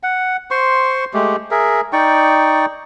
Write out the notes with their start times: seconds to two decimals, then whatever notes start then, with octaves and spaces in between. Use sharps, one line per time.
0.03 F#5
0.51 C5 C6 C#6
1.14 G#3 A3 G4
1.51 G#4 A#4 E5
1.93 D#4 D5 G5 C#6